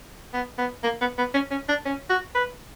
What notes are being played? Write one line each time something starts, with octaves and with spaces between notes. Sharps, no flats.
B3
B3
A#3
B3
B3
C#4
C#4
D4
C#4
F#4
B4